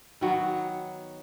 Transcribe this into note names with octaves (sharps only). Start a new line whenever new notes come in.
D#3 F#3 B3 F#4